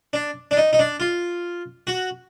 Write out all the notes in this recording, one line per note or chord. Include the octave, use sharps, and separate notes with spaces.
D4
D4
D#4
D#4
D4
F4
F#4